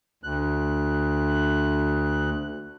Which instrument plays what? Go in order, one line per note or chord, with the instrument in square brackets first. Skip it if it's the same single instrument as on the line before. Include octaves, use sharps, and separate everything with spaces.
[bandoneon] D2 F#6